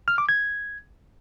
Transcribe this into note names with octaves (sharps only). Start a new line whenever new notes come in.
F6
D6
G#6